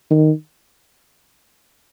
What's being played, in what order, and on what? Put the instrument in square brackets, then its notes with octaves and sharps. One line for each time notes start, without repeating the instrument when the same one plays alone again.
[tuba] D#3